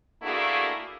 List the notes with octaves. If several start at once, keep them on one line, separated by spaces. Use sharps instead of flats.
A3 A#3 D4 E4 F#4 G#4